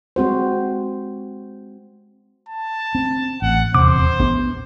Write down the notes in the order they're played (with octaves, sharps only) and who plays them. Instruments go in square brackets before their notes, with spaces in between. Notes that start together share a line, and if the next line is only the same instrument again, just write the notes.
[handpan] G#3 C4 F#4 C5
[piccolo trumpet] A5
[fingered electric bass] C4
[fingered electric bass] A1 [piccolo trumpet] F#5
[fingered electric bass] D#1 E2 C3 [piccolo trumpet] C5 [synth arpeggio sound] D6
[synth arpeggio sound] A#1 [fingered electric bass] B3